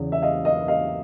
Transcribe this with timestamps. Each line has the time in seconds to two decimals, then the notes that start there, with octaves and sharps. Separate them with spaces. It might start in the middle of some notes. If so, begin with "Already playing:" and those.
Already playing: E2 C#3
0.12 E5
0.22 D#5 F5
0.45 D#5 F5
0.68 D#5 F5